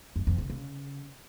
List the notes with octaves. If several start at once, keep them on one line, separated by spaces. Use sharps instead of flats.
F#2
F2
C#3
C#3